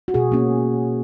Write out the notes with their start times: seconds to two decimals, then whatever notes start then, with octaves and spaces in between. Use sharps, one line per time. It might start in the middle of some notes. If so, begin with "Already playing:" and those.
0.08 F#4
0.14 B2 G#4
0.32 A#3 C#4